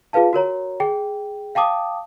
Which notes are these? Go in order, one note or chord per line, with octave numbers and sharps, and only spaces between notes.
F4 G#4 B4 F5 A5
F#4 A#4 C#5 A#5
G#4 G5
F5 G5 A5 D6 D#6